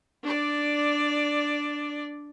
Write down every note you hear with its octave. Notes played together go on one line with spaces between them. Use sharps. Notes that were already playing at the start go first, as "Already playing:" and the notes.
D4 D5